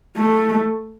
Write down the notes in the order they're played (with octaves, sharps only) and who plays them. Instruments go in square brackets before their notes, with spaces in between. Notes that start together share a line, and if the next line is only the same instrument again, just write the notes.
[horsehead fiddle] A3